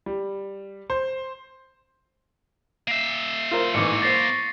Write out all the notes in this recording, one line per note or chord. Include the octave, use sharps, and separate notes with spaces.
G3
C5
A#3 E5 C7
F4 A#4 C5
A1 G#2 E3 C#6 D6 C#7
C5 C#6 A6 A#6 C7